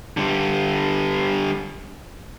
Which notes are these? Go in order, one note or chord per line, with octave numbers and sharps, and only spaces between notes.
D3 G3